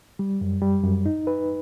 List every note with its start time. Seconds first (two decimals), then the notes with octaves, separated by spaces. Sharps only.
0.19 G3
0.41 F#2
0.61 G3
0.84 F#2
1.06 D#4
1.27 B4